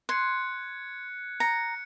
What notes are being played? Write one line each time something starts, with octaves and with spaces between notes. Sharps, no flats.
C6 F#6 G#6 C#7
A#5 C#7